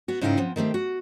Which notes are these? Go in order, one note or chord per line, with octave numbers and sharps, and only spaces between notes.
B3 F#4
G#2 C#3 D#4 E4 F5 G5
F3 B3 C4
D#3 A3 C4 G4
F#4